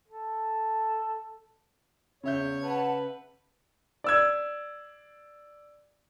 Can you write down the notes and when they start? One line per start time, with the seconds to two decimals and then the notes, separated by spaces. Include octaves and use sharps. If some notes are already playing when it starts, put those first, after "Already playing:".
0.08 A4
2.23 E2 C#3 C#5 E5 G6
2.62 B4 F#5 A5
4.04 D5 E6 G#6